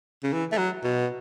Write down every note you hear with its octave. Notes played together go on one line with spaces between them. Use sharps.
C#3
E3
A3
F#3
B2